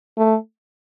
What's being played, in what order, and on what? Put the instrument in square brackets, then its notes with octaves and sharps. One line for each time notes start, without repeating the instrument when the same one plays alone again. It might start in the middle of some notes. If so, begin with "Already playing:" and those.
[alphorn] A3